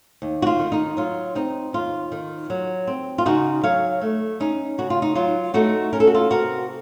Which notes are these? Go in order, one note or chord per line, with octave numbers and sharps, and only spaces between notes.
D#2
F#4
F4
D#3
D#4
F#3 F4
C4 D#4
D#2 F4
D#3
F#3
C4
F4
C#3 D#4 F#4
F#3 C#5 F5
A3
C#4 D#4
C#3 F#4
F4
D#4
F#3 F4
A3 D#4 F#4
C#4 A#4
A4
F#4
F4 A4
C3 F#4 A#4